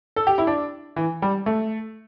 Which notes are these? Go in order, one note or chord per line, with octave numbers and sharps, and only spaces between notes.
A4
G4
E4
D4
E3
G3
A3